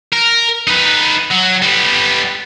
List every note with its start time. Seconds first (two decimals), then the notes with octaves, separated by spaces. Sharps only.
0.13 A#4
0.67 D#4 B4
1.31 F#3
1.62 G3 B3